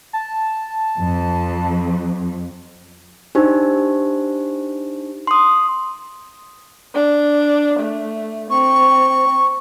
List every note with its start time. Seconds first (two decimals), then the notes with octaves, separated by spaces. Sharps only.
0.13 A5
1.00 F2
3.35 D4 D#4 G4 C5
5.27 C6 D#6
6.95 D4
7.79 A3
8.50 C4 C#6